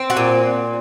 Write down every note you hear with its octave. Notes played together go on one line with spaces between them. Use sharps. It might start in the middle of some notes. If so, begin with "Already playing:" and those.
Already playing: C4
F#4
A#2